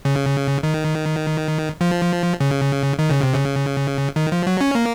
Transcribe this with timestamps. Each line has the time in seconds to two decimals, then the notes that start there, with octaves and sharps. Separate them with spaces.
0.05 C#3
0.63 D#3
1.81 F3
2.40 C#3
2.99 D#3
3.10 C#3
3.23 C3
3.35 C#3
4.16 D#3
4.32 F3
4.47 F#3
4.61 C#4
4.75 A#3